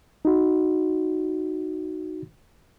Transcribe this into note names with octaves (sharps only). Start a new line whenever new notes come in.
D#4 F#4